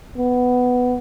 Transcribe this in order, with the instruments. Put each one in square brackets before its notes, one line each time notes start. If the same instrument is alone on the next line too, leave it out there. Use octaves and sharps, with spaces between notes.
[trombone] B3